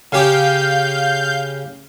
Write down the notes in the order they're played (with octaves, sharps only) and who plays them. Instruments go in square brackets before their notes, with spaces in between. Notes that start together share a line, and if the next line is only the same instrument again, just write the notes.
[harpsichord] C#3 G4 [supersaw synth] F5 G6